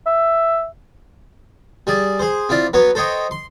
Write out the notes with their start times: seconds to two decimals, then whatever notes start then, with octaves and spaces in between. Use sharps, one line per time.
0.06 E5
1.87 G3 G#4 D5
2.19 G#4 C5
2.49 C4 E4 F4 D5
2.73 F#3 B3 B4 C#5
2.95 A4 C5 C#5 D#5 G5
3.31 C6